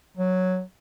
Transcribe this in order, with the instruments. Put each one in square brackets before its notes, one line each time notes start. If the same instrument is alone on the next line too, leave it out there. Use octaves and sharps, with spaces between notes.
[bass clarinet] F#3